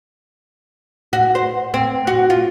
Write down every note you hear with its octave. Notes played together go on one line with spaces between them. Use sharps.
F#4
C5
C4
F#4
F4